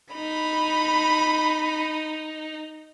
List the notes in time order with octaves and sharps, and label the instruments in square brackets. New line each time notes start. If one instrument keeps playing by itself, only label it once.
[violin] D#4 [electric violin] B5